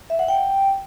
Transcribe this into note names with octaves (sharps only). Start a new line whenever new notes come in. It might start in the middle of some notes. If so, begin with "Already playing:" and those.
E5
F#5
G5